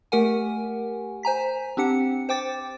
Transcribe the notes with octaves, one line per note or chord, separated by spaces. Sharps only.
A3 G4 A#4 F#5 G#5
C5 G#5 A#5 B6
C4 D4 G4 F#5 C#7
C5 G5 D6 A6